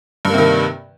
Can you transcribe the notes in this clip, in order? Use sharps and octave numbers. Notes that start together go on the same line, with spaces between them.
G2 C3 D#3 A#3